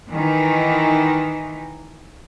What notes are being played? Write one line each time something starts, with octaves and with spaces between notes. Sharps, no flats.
D#3 E3 D#4